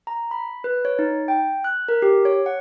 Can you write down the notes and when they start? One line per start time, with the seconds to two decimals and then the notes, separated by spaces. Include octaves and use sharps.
0.07 A#5
0.31 B5
0.64 B4
0.85 C#5
0.99 D#4
1.28 G5
1.64 F#6
1.88 A#4
2.02 G4
2.25 C#5
2.46 F#5